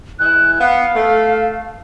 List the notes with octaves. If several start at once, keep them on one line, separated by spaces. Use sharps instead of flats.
E3 G#3 E4 F#6
B3 F5
A3